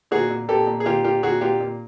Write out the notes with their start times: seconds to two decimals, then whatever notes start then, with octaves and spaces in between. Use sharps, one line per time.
0.11 A#2 F#4 G#4
0.30 A#2
0.49 A#2 G4 A4
0.67 A#2
0.80 G#4
0.86 A#2 F4 G4
1.04 A#2 F4 G4
1.23 A#2 F#4 G#4
1.41 A#2 F4 G4
1.60 A#2